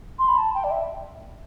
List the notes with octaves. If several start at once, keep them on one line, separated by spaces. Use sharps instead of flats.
C6
B5
A5
G5
D5
E5